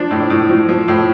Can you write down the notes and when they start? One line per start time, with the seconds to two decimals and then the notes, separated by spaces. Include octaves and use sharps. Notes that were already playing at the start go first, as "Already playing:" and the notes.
Already playing: F3 D4
0.11 A2
0.30 A2
0.49 F3
0.69 F3
0.88 A2